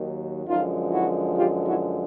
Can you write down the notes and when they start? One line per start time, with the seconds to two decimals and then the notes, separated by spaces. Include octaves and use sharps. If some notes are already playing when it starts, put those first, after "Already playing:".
Already playing: D#2 D#3 F#3
0.46 F#2 D3 F3 G#3 D#4 F4
0.91 E4 F#4
1.35 F4 G4
1.64 E4 F#4